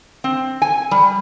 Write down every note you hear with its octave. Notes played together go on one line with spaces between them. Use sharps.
C4
G#5
G3